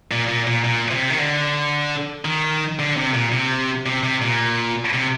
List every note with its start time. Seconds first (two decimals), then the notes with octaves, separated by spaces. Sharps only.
0.11 A#2
0.29 A#2
0.47 A#2
0.64 A#2
0.91 C3
1.10 D#3
1.19 D3
2.25 D#3
2.79 D3
2.97 C3
3.14 A#2
3.32 C3
3.86 C3
4.03 C3
4.22 A#2
4.93 C3